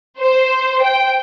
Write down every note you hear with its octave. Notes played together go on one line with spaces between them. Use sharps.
C5
G5